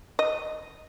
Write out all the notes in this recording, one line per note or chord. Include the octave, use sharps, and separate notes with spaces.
D#5